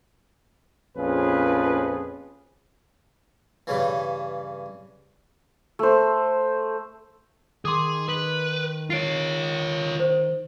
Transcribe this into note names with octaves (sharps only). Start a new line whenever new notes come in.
A#1 F2 C#4 F4 G#4 B4
G2 C#3 E3
A3 C5
D#3 G#4 C6 D6 D#6
B4
F4 C#5 C7 D7
C5